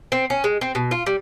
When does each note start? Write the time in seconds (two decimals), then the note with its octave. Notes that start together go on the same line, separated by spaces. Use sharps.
0.12 C4
0.30 C#4
0.44 G#3
0.61 C4
0.75 B2
0.91 F4
1.06 G3